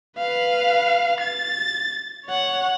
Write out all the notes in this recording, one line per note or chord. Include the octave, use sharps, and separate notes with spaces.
B4 F5
A6
C#5 F#5